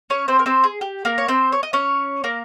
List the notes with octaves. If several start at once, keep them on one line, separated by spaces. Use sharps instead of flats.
C#4 C#5
C4 C5
A#4
C4 C5
G#4
G4
A#3 A#4
C#5
C4 C5
C#5
D#5
C#4 C#5
A#3 A#4